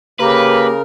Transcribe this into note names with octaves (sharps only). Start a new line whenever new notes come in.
C#3 A#3 G4 A#4 B4